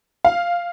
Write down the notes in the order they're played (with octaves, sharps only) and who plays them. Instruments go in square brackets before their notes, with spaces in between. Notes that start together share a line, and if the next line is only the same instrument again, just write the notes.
[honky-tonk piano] F5